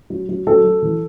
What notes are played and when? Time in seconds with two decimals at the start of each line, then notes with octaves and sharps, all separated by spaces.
0.10 F#3
0.29 F#3
0.47 F#3 A4
0.64 F#3
0.82 E3